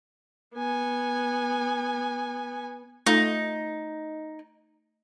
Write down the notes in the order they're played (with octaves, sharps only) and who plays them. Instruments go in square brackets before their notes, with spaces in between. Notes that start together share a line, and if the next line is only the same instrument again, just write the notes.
[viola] B3 G#5
[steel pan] A3 F4 [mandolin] D#4